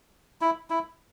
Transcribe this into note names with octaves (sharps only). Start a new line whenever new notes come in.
E4
E4